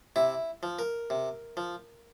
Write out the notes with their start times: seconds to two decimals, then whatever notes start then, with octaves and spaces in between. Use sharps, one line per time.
0.16 C3 E4
0.63 F3
0.79 A#4
1.10 C3
1.57 F3